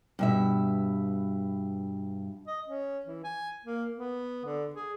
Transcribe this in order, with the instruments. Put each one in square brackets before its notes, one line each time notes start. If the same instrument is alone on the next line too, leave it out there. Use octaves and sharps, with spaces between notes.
[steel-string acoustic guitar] G2 B2 E5
[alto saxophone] D#5
C#4
E3
G#5
A#3
B3
D3
G#4